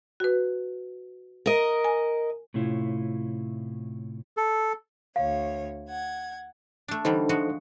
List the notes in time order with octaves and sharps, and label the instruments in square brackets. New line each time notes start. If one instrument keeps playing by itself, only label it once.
[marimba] F#4 B4
[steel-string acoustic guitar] A#4 D#5
[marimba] G#5
[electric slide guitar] A2 C3 A3 C#4 E4 F4
[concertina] A4
[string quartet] D2 C#5 [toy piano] F5
[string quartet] F#5 G#6
[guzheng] A3 D4
[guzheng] D3 E3 G3 [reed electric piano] D#4 A4 C5
[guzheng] F3 G#3 F#4